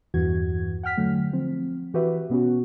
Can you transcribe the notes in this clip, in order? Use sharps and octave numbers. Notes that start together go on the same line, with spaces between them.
E2 G2 E3 F#4 G#6
F#5 G5 F6 B6
D3 F#3 A3
F3 C4
E3 F#4 G4 B4 E5
B2 B3 C#4 F#4